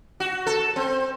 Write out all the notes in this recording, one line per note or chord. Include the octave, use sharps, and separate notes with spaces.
F#4
A4
C4